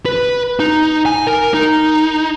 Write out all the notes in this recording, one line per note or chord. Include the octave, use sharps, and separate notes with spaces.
B4
D#4
G#5
A#4
D#4